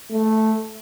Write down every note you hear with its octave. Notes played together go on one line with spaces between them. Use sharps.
A3